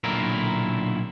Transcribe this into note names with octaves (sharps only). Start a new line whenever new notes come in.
B1 A#2 D3 E4 A#4